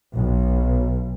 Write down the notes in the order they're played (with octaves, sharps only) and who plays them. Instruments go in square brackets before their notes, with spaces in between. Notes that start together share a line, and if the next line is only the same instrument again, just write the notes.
[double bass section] B1